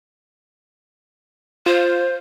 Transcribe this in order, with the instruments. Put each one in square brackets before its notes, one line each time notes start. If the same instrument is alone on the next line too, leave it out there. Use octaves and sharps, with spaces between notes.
[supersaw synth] F4 [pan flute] C5